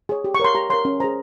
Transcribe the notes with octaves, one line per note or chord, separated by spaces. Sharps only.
G#4 C#5
G4
C#6
A#4 C#5 C6
G4 A#5
A#4 C#5 C6
C#4
G#4 C5 A#5